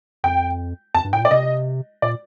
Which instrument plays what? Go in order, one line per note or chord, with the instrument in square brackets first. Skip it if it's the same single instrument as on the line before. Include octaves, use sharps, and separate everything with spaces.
[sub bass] F2 [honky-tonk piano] G5
[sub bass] F2 [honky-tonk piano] A5
[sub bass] G2
[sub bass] A2 [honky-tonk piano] G5
[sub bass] A#2
[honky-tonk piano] D5
[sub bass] C3 [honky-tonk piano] D#5
[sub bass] A#2 [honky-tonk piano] D5